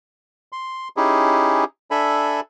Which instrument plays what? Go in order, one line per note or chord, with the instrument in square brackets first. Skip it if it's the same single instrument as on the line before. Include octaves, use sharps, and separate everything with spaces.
[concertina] C6
C#4 D#4 E4 G4 G#4
D4 A4 E5 G#5 B5